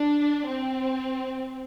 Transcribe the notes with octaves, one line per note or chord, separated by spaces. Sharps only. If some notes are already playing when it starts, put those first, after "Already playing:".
Already playing: D4
C4